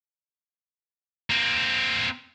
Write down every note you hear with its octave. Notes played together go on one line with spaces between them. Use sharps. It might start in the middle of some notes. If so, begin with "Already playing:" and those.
A#3 C4